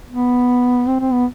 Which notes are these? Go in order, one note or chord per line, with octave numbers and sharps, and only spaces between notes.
B3
C4
C4
B3